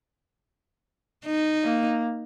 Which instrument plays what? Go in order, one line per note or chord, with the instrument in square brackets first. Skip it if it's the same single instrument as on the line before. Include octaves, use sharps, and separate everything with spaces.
[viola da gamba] D#4
[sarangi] A#3